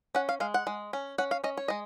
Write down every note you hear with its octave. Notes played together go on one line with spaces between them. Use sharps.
C#4 F#5
F5
G#3 F5
F#5
G#3
C#4
C#4 F#5
F5
C#4 D#5
C#5
G#3 D#5